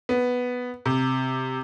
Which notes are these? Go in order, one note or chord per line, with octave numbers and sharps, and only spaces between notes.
B3
C3